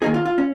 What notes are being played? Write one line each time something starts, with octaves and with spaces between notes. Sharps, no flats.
D#3 A#3 D#4 G#4
F4
F4
C#4